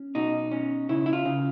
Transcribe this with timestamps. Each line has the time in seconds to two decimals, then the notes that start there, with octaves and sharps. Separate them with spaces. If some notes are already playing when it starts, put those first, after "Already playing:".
Already playing: C#4
0.15 B2 D#4
0.52 C#4
0.89 C#3 E4
1.06 E4
1.13 F4
1.26 C#3